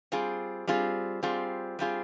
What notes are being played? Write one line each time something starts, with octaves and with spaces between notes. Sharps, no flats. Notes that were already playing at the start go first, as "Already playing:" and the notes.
G3 C4 F4 G#4
G3 C4 F4 G#4
G3 C4 F4 G#4
G3 C4 F4 G#4